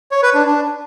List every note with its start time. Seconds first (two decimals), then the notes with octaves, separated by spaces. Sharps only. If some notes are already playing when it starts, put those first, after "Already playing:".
0.11 C#5
0.23 B4
0.34 D4
0.46 D4